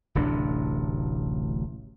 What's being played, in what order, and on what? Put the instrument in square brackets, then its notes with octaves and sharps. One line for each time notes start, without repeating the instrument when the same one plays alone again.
[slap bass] D1 A1 C3 D4